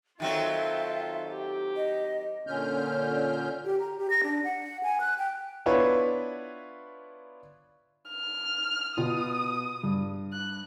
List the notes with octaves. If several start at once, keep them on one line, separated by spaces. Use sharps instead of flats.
D#3 F#3 C4 F4 A4 E5
G4
D#5
A#2 D3 C#4 F6 G6
G4
A#5
G4
A#6
D4
F#5
G#5
F#6
G5
B3 D4 E4 F4 B4 C#5
F6
B2 F4 D#6
G2
F#6